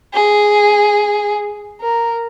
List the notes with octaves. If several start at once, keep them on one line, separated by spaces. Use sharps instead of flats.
G#4
A#4